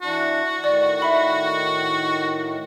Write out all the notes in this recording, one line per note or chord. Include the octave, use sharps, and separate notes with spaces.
E3 D4 F#4
A2 D#3 D5
E5 B5